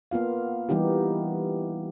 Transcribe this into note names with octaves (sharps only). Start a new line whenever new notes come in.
A#3 B3 F4 F5
E3 G3 B3 D#4 G4